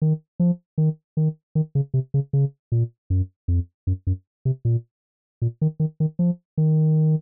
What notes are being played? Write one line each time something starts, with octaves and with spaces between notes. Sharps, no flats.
D#3
F3
D#3
D#3
D#3
C#3
C3
C#3
C#3
A#2
F#2
F2
F#2
F#2
C3
A#2
A#2
D#3
D#3
D#3
F3
D#3